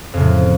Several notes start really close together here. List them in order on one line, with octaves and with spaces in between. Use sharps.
F2 C#3 A2 F3